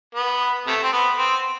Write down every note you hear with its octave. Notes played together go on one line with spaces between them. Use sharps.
B3
C3 A3
C4
B3
C4